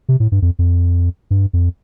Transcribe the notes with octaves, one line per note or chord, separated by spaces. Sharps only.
C3
A2
G2
F2
F2
G2
F2